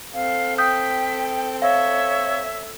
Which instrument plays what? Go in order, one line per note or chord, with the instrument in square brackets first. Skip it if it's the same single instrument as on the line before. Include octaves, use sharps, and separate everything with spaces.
[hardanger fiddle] C4 A4 [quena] F5
[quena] G5 [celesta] D#6 G6 [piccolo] B6
[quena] C#5 [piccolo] E5 [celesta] F5